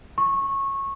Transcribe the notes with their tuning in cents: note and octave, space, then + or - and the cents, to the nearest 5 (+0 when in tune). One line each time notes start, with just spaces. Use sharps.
C#6 -20